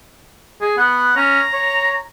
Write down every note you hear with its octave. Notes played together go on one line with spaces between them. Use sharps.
G#4
B3 F#5
C#4 A#5
C#5